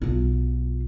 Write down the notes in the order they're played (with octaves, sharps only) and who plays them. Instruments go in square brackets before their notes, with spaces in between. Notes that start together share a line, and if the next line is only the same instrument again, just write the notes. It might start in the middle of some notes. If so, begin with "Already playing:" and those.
[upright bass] B1 F4